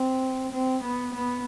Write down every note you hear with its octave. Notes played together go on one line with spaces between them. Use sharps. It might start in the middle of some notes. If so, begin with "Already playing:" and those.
Already playing: C4
C4
B3
B3